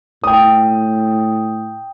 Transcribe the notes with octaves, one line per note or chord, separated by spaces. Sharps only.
A2 G5 D#6